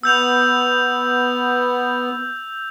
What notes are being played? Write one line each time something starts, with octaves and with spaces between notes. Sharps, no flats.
B3 E6 G6 F7